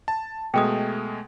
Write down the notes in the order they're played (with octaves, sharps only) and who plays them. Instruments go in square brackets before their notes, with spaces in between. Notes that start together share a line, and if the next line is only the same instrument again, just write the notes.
[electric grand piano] A5
[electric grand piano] B2 G#3 A3 [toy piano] G5 D#6